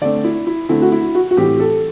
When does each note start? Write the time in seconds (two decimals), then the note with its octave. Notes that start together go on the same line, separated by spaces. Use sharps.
0.01 D3 A3 C4 D5
0.24 E4
0.47 E4
0.69 D3 A3 C4 E4
0.82 F#4
0.92 E4
1.15 F#4
1.31 F#4
1.37 A2 E3 G3 C4 G4
1.60 A4